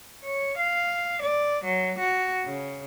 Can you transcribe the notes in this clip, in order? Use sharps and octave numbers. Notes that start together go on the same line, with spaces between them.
C#5
F5
D5
F#3
F#4
C#3